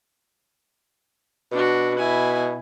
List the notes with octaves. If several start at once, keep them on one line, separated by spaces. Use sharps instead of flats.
B2 D4 F#4
E4 G#5